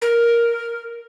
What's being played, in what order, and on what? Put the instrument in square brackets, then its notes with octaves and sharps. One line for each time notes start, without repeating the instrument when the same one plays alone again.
[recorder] A#4